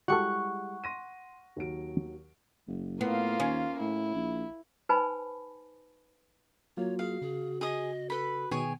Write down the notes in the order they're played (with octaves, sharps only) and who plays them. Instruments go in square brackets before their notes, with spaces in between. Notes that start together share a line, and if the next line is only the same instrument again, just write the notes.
[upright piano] G3 G#3 E4 [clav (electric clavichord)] F#4 G4 A4 [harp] F#5 C#6
[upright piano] C6 A#6 D#7
D#2 F#3 D7
[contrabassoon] F#1
[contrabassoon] A2 [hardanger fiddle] A#3 F4 [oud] B3
[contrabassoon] D#2 [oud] C#4
[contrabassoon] A2 [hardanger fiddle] E4
[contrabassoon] A#1
[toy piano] D#4 B4 C5 G#5 A5 B5
[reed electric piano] F#3 A#3 F4 [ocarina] F#4 [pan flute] C#5
[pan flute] G#4 [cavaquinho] F5
[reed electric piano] C#3 [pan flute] G#4
[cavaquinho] G#4 D#6 [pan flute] D#5
[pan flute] A4 [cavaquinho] B4 B5
[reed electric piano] B2 D#3 B3 [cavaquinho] G#4 C#5 G#5 [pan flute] G5